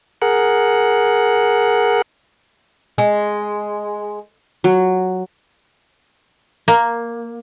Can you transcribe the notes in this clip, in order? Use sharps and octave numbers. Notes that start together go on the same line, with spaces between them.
G#4 A#4 F#5
G#3
F#3
A#3